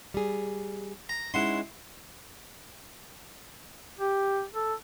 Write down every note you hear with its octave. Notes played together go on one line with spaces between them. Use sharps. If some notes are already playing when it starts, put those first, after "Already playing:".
G3 G#4
A#5
G#3 C#4 D#4 E4 F#5 C6
G4
A4